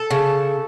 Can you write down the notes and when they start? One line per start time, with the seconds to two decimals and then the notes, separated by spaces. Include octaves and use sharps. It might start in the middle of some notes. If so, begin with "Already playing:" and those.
Already playing: A4
0.11 C#3